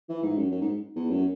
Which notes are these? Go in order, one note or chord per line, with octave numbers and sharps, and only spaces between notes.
E3
G#2
F#2
F#2
G#2
E2
F#2